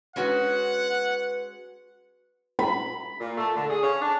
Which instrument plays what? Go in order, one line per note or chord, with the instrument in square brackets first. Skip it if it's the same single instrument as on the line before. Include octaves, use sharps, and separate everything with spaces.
[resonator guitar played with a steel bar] G#3 C#4 F#4 [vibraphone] B4 [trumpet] F#5
[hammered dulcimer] B5
[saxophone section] A#2
A3
D3
G#4
C#4
D4